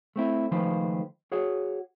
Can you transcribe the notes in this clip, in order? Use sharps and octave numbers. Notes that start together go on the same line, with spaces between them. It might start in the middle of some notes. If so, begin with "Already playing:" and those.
A3 C4 E4
C#2 D#3 F3 A3 B4 C5
F#4 G#4 C#5 F#5